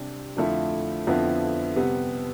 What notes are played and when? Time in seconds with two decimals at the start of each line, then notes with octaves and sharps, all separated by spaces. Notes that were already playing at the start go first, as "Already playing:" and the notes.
Already playing: C3 G3 D4
0.36 F2 D3 F3 A3 E4
1.07 F2 D3 F3 B3 E4
1.76 C3 G3 B3